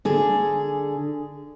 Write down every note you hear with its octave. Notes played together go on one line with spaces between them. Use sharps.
D3 G#4